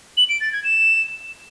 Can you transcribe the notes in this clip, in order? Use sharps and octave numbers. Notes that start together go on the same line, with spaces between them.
F#7
D7
A6
G#6
E7